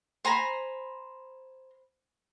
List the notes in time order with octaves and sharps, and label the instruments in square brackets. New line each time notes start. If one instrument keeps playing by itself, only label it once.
[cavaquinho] C5 G#5 A#5 B5